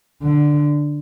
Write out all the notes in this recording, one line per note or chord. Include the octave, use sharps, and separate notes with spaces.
D3